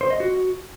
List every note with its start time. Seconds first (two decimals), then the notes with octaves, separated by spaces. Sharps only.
0.01 C5
0.10 D#5
0.20 F#4